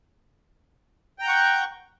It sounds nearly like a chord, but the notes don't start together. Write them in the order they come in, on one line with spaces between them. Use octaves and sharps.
G5 A#5 G6 F#5 C#6